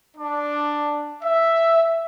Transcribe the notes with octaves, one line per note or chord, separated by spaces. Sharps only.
D4
E5